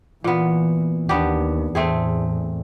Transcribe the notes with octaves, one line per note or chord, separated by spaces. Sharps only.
A#2 E3 B3
D#2 B3 D4 G4
E2 A2 A3 C4 G#4